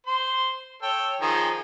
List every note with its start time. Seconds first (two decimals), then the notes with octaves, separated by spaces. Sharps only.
0.07 C5 C6
0.82 A4 C#5 G5
1.21 D#3 F3 G#4